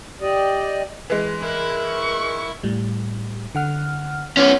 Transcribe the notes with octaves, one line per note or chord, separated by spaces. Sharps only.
G4 D5 D#5
E3 G#3
E4 A#4 F#6
C#6
A2 G3
D3 F#5 F6
B3 C#4 C6 D6